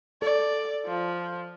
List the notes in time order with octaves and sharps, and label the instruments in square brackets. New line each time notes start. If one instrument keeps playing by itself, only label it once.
[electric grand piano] A4 [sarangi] D5
[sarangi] F3